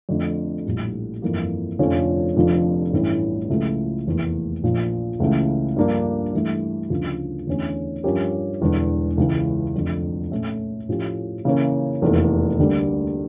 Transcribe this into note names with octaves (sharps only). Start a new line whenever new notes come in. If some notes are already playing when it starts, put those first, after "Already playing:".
F2 D3 A3
A#1 A2 G3
G1 F2 E3 A#3
F1 F2 D3 F3 C#4
F1 F2 D3 F3
A1 G2 E3 A3 C#4
C#2 C#3 F3 A3 E4
F1 E2 E3 A#3
A#1 A#2 F3
C#2 C#3 E3 A3
G2 F3 A#3 D4
G2 E3 A3
D2 C#3 F3
E2 D3 A3 C#4
G2 F3 C#4 G4 A#4
E1 E2 D3
C#2 C#3 E3
F1 F2 D3
A#2 A3 C#4
A2 F3 C#4 G4
C#3 E3 A#3 C#4
F1 E2 E3 A#3
D2 D3 G3 A#3